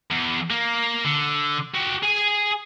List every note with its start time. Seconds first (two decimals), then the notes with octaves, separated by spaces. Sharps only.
0.11 E2
0.50 A#3
1.05 D3
1.75 F#4 G4
2.03 G#4 G#5